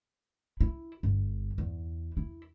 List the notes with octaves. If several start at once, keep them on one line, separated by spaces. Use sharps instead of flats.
E4
G1
E2
E4